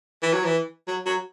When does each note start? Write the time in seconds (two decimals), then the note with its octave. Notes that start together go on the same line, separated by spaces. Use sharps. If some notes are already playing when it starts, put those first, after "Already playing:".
0.23 E3
0.33 F#3
0.45 E3
0.88 F#3
1.06 F#3